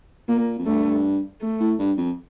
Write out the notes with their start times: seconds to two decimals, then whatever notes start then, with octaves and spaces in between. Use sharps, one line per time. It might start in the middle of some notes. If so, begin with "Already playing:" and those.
0.28 A#2 A#3
0.58 F2
0.66 G2 A3
1.41 A3
1.60 A2
1.79 G2
1.97 F2